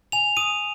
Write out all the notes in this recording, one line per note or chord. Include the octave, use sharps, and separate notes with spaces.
G#5 F7
D#6 D#7